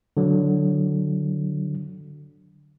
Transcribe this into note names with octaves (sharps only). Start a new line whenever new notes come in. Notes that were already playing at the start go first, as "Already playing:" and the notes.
D3 F#3